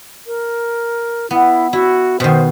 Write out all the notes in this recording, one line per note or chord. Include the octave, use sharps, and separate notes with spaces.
A#4
B3 E4
E4 F#4
B2 D#3 C5